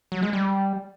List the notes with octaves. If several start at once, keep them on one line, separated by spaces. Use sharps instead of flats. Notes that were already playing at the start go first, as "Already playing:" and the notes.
F#3
G#3
G3